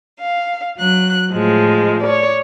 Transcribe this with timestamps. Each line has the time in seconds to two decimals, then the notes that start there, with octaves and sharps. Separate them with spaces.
0.19 F5
0.76 F#3 F#6
1.31 A2 F3 G#3
2.02 C#5 D5